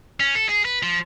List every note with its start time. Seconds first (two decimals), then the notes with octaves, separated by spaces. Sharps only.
0.20 C#4
0.35 A4
0.49 G#4
0.65 B4
0.83 F3